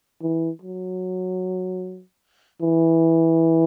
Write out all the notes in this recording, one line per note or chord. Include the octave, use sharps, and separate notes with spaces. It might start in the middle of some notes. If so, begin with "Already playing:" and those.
E3
F#3
E3